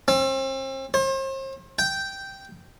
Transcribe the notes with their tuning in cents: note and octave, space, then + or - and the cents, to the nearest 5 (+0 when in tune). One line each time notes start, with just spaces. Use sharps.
C4 +40
C5 +40
G5 -5